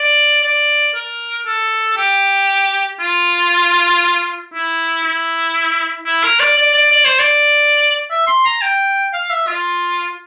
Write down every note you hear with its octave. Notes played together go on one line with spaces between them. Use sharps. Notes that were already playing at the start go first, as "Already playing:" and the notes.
Already playing: D5
D5
A#4
A4
G4
F4
E4
E4
E4
A#4
D5
D5
D5
D5
C5
D5
E5
C6
A#5
G5
F5
E5
F4